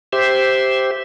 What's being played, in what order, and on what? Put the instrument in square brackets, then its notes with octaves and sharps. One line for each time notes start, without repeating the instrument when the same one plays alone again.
[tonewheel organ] G4 C5 E5